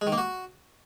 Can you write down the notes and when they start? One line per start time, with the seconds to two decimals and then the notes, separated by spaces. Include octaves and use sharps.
0.01 G#3
0.07 D#3
0.12 A#3
0.18 F#4